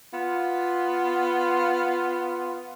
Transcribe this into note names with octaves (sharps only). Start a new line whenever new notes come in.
B3 F4